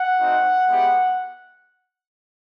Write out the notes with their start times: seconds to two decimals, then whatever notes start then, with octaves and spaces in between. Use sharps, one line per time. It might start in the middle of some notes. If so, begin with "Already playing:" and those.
Already playing: F#5
0.18 A3 C4 D#4 F#4
0.68 G#3 B3 E4 G4